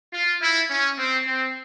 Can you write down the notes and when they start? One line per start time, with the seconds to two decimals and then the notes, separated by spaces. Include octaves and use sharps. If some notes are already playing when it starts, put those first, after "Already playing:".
0.13 F4
0.41 E4
0.70 C#4
0.98 C4
1.25 C4